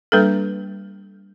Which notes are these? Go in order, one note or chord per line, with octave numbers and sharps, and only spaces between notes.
G3 A#3 D4 A4 B4